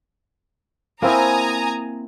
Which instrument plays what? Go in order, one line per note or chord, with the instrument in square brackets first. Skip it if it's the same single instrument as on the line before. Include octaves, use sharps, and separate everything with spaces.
[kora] A#3 C4 E4 [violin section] G#5 A#5 D#6